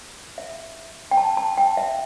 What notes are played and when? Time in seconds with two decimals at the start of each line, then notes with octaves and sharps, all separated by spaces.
0.38 E5
1.11 G5
1.17 A5
1.37 A5
1.58 G5
1.77 E5